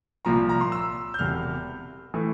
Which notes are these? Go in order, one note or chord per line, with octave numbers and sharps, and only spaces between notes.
C2 A#2 F3 A#5
A#5
C6
E6
G6
E1 E2 C3 F6
E3 A3